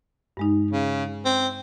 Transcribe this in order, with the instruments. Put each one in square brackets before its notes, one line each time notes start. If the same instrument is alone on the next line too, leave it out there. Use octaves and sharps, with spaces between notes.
[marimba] G2 G#3 D#4
[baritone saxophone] C#3
C4